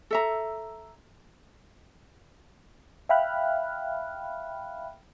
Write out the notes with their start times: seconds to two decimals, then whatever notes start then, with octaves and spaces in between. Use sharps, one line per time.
0.11 A4 E5 A#5
3.09 E5 F5 G5 B5 F6 F#6